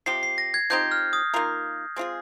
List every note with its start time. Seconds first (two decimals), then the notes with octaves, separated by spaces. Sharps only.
0.06 C3 F3 C4 G4 C7
0.23 C7
0.38 A#6
0.54 G#6
0.70 F3 C4 D#4 G4 G6
0.91 F6
1.13 D#6
1.34 D#3 A#3 F4 A#4
1.96 G#3 C4 F4 G#4